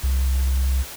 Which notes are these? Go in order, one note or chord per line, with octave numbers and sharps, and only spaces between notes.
C2